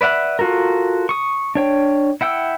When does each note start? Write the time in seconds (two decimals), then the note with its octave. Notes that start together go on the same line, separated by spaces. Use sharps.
0.01 B4 D5 E5 F#5 B5
0.39 F4 F#4 A4 A#4
1.09 C#6 D#6
1.55 D4 C#5 G5
2.21 E4 F#5 G5 E6